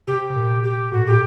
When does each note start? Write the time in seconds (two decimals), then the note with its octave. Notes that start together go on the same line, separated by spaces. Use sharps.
0.07 C3 G4
0.30 C3
0.36 A#2
0.63 G4
0.92 A2 F#4
1.01 A#2
1.06 A2 G4